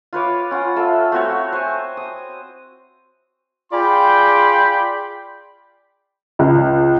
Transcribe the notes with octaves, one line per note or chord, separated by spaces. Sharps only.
F4 B4 C#5 D6
C#4 F4 F#5 G5
F4 A4 E5
A3 C4 F#4 C#5
C5 G#5
D#6
F4 G#4 D5 G5 B5 C6
C#2